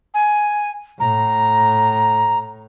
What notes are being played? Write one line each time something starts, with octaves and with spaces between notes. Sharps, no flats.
G#5
A2 A#5